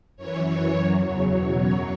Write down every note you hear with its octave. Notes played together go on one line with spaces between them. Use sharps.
F#2 E3 C#5
F#2 E3 C#5
F#2 F#3
E2 C#3 F#3 C#5
E2 B2 F#3 C#5
F#2 F#3 C#5